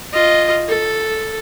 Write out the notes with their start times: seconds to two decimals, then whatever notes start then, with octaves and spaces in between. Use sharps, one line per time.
0.13 F4 D#5
0.69 A4